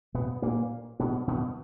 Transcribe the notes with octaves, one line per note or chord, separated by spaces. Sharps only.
B2 B3
A#2 A#3
B2 B3
B2 B3